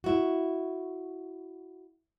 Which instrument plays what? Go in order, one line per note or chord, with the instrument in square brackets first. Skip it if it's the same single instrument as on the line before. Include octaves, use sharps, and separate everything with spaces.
[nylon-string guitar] E4 F#4